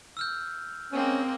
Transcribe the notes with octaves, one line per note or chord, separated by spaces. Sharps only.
E6 F6 G6
G#3 A#3 C4 C#4